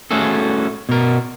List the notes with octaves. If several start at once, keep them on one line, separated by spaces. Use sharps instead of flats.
A3 C#4 F#4 G#4 A4
B2 A#4